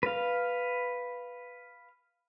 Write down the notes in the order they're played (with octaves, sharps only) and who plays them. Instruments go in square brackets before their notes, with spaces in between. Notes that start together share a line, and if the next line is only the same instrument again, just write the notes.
[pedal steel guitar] B4 F5